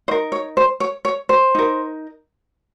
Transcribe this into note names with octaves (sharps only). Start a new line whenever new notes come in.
D#4 A#4 C5
C#5
C5
C#5
C#5
C5
D#4 A#4